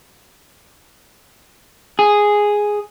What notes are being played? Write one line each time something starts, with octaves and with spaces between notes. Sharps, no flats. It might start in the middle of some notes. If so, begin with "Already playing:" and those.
G#4